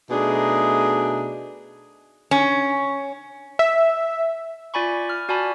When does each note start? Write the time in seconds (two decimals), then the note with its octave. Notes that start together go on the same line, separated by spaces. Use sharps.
0.10 B2 A3 D4 D#4 G#4
2.31 C#4
3.59 E5
4.74 F4 D5 G#5 B5 C#6
5.10 F6
5.29 F#4 D5 G#5 A5 B5